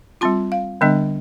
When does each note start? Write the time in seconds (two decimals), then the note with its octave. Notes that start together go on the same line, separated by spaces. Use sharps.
0.21 G3 C4 F4 C6
0.52 F5
0.81 D3 G3 B3 D4 D#5